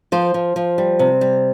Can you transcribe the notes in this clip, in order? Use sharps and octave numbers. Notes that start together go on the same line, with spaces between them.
F3 C5
F3
F3
G3
C3
G3